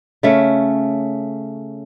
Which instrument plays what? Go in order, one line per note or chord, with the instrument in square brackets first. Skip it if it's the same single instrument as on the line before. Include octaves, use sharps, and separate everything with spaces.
[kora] C#3 A3 C#4